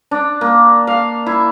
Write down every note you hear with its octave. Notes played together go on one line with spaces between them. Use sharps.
D4
A#3
F5
E4